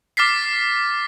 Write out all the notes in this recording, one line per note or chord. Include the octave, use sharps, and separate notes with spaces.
D6 F6 A6 B6 C7